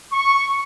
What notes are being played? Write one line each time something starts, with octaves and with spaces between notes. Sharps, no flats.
C#6